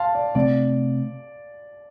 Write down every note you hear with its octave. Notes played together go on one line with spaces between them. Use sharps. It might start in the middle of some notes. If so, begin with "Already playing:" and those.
Already playing: F5 A5 C6
D5
C3 A3 C4 D5